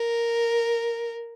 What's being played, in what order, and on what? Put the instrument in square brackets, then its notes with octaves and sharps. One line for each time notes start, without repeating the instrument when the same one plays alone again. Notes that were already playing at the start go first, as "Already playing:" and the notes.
Already playing: [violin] A#4